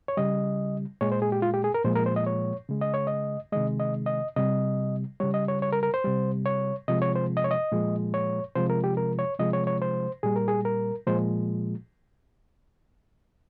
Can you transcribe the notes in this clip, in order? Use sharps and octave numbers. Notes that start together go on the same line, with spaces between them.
C#5
C#3 G3 D#5
A#2 G#3 C#5
C5
G#4
G4
F4
G4
G#4
A#4
A#2 F3 G#3 C5
A#4
C5
D#5
C#5
C#3 G#3
D#5
C#5
D#5
C3 D#3 G#3 D#5
D#5
D#5
C3 G3 D#5
C#3 G3 C#5
D#5
C#5
C#5
A#4
A#4
C5
C3 G3
C#5
C3 F3 G#3 D#5
C#5
C5
D#5
C#5
D#5
A#2 F3 G#3
C#5
C3 F3 G#3 C5
A#4
G4
A#4
C#5
C3 F3 G#3 D#5
C#5
C#5
C5
A#2 G3 G#4
A#4
G#4
A#4
A#2 F3 G#3 C5